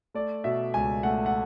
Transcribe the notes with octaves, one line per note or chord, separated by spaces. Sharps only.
A3 D5
B2 E5
C#2 G#5
A3 F#5
F#5